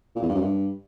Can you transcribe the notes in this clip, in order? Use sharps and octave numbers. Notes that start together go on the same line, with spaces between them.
A#2
E2
G2
F#2
G2